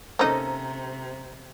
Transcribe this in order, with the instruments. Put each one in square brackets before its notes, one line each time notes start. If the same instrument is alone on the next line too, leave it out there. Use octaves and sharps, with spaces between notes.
[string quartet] C3 [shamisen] A#3 D#4 [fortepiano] C#4 A4 D#5 [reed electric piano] C5 A#5